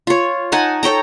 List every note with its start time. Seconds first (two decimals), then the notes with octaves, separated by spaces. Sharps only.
0.07 F4 C#5
0.52 D#4 F#5 G#5 A5
0.83 A4 C#5 G5 A#5